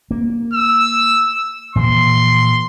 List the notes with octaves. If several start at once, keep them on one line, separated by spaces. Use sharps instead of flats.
A#3
E6
A#2 E3 F3 C6